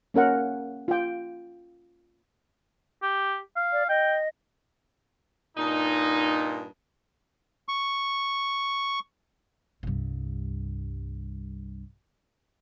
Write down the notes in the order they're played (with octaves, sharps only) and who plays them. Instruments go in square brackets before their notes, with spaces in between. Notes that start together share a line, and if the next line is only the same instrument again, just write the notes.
[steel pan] A#3 C#4 A#4 F#5
F4 G5
[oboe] G4
F5
[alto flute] D5
[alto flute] D#5 [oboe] G5
[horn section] G2 A#2 D#4
[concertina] C#6
[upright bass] C2 G2